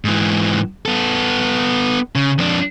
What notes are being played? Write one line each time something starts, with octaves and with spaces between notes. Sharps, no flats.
G#2 E3
B3 A4
C#3
F2 D4